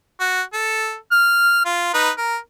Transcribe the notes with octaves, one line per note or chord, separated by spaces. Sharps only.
F#4
A4
F6
F4
D#4 B4
A#4